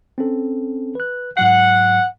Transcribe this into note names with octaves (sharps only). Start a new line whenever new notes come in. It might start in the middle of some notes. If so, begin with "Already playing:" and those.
C4 C#4 A4
B4 F#6
G#2 F#3 F#5 C7